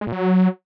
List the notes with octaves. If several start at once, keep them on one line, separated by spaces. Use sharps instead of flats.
G#3
A#2
F#3